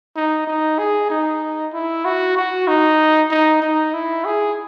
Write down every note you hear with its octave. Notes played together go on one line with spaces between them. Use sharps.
D#4
D#4
G#4
D#4
E4
F#4
F#4
D#4
D#4
D#4
E4
G#4